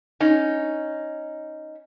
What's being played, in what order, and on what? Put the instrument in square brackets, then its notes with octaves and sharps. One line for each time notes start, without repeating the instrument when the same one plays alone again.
[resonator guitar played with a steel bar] C#4 D#4